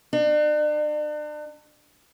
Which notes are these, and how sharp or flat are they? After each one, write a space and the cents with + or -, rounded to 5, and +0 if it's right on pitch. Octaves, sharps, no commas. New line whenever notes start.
D4 +40